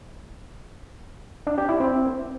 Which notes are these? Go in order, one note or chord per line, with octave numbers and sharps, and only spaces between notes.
D4
G4
E4
C4